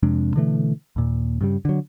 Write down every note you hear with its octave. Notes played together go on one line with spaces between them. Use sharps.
F2 C3 G#3 D4
B2 D3 E3 A3
D#2 A#2
G2 C#3 G3
D3 F#3